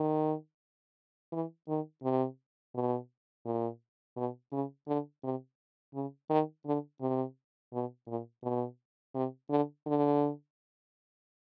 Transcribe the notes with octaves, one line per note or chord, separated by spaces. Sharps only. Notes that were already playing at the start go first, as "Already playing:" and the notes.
Already playing: D#3
E3
D#3
C3
B2
A#2
B2
C#3
D3
C3
C#3
D#3
D3
C3
B2
A#2
B2
C3
D3
D3